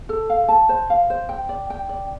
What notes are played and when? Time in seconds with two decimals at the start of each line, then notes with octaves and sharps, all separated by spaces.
0.09 A4
0.30 F5
0.48 A5
0.69 C5
0.90 F5
1.10 C5
1.29 G5
1.49 D5
1.70 G5
1.89 D5